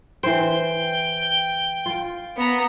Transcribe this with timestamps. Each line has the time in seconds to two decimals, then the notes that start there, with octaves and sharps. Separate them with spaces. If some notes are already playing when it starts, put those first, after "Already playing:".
0.23 E3 C5 G5
1.86 F4
2.37 B3 A#5